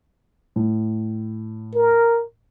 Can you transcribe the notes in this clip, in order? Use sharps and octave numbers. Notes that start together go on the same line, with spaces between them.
A2
A#4